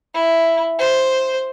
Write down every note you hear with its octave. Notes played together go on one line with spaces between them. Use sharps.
E4
C5